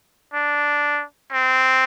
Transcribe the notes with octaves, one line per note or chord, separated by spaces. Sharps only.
D4
C4